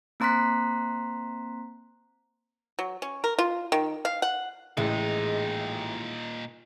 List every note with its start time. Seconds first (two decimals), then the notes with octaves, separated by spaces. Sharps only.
0.20 A#3 C4 A#5 C6 F#6 B6
2.79 F#3
3.02 C#4
3.24 A#4
3.39 F4
3.72 D#3
4.05 F5
4.22 F#5
4.77 A1 A#2 G#3 D#4